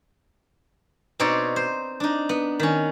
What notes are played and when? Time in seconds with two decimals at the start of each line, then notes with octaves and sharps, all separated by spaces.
1.20 B2 C4 D#4 C#5 D5
1.56 C5
2.00 D4 D#4
2.29 B3
2.60 D#3 C#4